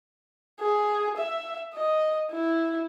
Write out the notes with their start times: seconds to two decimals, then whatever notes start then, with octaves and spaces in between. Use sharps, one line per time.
0.60 G#4
1.17 E5
1.74 D#5
2.32 E4